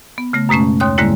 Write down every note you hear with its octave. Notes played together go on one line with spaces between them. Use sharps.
B3
C#3 A3 A#6
F#2 B2 G#3 A3 C#4
D#2 C#5 C6 D#6 F#6
G#2 D3 G3 G#3 A#3 E4